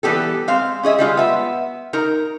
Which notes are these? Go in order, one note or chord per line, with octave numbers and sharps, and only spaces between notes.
E3 G3 B3 G4 A4
G#3 C4 F5
C#4 G#4 D#5 E5
G3 G#3 F4
B3 E5
D#4 A#4 A#5